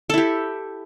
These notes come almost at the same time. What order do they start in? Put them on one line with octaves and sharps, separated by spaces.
A4 E4 G4